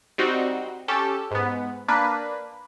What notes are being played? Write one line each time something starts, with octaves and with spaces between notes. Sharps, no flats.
G3 C4 D#4 F#4
C#4 G4 A4
G#2 B3
A#3 D4 B4